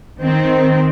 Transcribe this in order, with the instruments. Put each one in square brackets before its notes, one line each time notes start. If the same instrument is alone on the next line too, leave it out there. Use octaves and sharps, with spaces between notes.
[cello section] D#3 C4